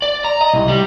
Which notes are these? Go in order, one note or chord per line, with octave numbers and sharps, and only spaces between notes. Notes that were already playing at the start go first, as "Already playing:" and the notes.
D5
A#5
D#5
C2
G3